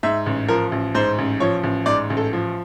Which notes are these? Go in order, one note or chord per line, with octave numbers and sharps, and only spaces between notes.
G#2 E5
A1
F3 A#4
A1
G#2 C5
A1
F3 C#5
A1
G#2 D5
A1
A4
F3